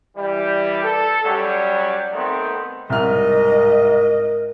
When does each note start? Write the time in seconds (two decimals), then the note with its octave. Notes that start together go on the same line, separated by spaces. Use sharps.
0.15 E3 G3
0.83 A4
1.24 F#2 F#3 G3
2.12 D#3 A3 B3 C4
2.90 C2 G#2 A#4 D#5 F6